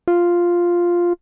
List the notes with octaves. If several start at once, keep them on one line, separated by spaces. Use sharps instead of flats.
F4